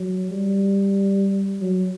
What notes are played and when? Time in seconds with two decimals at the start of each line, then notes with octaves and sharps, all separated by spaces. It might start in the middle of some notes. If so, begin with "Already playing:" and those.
Already playing: F#3
0.31 G3
1.61 F#3